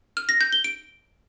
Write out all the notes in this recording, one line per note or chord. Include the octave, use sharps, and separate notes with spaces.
F6
A#6
G6
G7
D7